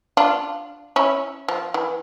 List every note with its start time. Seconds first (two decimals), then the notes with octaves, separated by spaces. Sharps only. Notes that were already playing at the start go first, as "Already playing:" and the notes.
0.17 D4 F4
0.96 C#4 E4
1.48 F3
1.74 E3